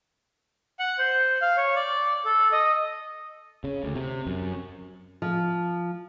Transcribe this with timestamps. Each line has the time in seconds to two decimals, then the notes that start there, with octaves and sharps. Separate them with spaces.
0.79 F#5
0.98 C5
1.42 F5
1.57 C#5
1.76 D5
2.25 A4
2.52 D#5
3.64 C#3
3.83 D2
3.96 C3
4.27 F#2
5.22 F3